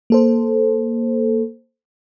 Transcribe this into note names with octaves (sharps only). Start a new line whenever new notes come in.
A#3 A4 C5